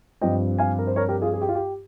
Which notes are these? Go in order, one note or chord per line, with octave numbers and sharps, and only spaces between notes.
G2 F3 C4 D#5 G5
F5 G#5
A#4
C5
A#4 C#5
G4 A#4
F4 G#4
G#4
G4
F4
G4